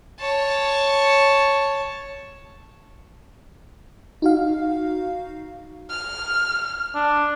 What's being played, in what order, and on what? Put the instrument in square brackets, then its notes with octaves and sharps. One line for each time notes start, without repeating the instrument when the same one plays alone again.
[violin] C#5 A5
[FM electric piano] D#4 F#4 F5
[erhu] F6
[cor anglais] D4